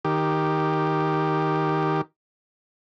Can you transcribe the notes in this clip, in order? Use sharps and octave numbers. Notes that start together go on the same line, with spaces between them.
D#3 G4